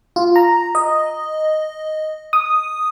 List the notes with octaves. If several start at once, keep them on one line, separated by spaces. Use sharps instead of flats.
F4
A#5
D#5
D#6